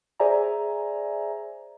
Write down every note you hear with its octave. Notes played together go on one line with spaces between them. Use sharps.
G#4 C5 D5 E5 G#5 A#5